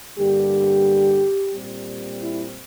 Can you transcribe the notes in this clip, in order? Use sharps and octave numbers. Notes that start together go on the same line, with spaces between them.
G2 D3 G3 A#3 G4
A#2 G3 C4
E4